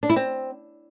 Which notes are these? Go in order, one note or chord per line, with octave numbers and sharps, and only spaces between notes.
D4
E4
C4